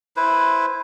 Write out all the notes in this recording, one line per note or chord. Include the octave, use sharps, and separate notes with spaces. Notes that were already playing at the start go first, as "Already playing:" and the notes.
E4 B4 C5